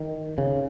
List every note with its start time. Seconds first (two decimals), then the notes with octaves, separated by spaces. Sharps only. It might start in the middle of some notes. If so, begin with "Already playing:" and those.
Already playing: D#3
0.38 C#3